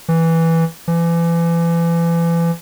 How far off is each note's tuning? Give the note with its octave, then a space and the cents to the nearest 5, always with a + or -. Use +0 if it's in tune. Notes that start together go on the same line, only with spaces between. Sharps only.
E3 -5
E3 +35